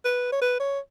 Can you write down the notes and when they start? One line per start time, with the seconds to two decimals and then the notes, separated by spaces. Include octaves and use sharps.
0.05 B4
0.32 C#5
0.42 B4
0.60 C#5